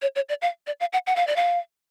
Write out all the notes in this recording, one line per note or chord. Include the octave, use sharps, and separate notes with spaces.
C#5
C#5
D5
F5
D5
F5
F#5
F#5
F5
D5
F5